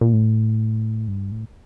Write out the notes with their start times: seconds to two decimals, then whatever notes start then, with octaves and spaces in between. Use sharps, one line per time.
0.01 A#2
0.13 A2
1.08 G2
1.32 A2